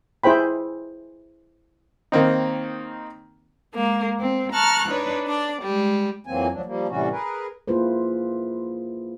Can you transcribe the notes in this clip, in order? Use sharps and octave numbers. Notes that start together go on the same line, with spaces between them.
E4 G#4 C5 G5 B5
D#3 A#3 C4 D#4
G#3 A#3
C4
A5 A#5 C#6 F6 F#6
D4 D#4 B4 C#5
D4 D5
G3 G#3
F2 E3 F#3 A#3 C4 G#5
D2 F3 F#3 D4
F3 G3 A#3
A2 C3 E3 G3 C#4 F#4
G#4 A#4 B4
A#3 E4 F4 G#4 B4 C5